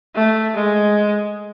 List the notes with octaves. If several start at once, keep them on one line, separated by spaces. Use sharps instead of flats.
A3
G#3